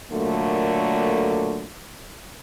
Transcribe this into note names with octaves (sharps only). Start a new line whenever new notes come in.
A#2 D3 F#3 A3 A#3